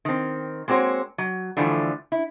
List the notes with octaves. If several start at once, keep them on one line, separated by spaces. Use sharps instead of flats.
D#3 C4
G#3 A#3 C4 F#4 C5 C#5
F#3
D3 E3 F3 G3 A3
E4